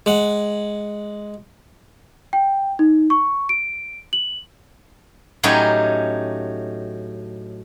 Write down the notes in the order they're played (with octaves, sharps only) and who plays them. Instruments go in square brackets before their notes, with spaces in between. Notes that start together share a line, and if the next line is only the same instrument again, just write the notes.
[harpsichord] G#3 F#5
[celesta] G5
D#4
C#6
D7
F#7
[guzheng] A2 F#3 C#4 D#4 G4 G#5